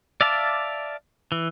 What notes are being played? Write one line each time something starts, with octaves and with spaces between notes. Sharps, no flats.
D5 E5 F5 A5 D6
E3